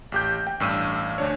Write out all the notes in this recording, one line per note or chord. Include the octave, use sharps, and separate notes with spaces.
A1 G4 G6
G5
A1 G2 E6 D#7
D2 D4 C#5